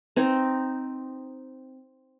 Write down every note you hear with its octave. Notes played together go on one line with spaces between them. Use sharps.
C4 D#4